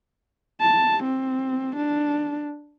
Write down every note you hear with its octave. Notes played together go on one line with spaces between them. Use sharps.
A5
C4
D4